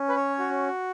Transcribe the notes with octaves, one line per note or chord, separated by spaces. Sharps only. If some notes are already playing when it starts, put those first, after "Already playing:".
Already playing: C#4
B4
C#5
F#4